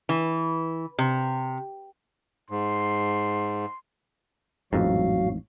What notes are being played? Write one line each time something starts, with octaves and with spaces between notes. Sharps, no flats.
E3
C3
G#2 C6
A1 F2 G#2 F#3 F#4 F5